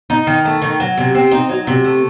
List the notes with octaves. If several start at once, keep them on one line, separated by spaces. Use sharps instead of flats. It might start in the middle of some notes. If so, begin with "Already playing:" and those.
D#4
D#3
A3
D#3
F#3
C3
C4
D#4
F#3
C3
A3